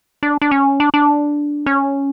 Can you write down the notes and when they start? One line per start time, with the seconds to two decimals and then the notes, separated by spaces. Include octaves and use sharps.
0.23 D4
0.42 D4
0.51 C#4
0.80 D4
0.94 D4
1.66 C#4